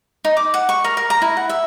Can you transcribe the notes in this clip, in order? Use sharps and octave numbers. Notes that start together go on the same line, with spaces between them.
D#4
D6
F#5
C#6
A#4
A#4
A#5
E4
F#5
E5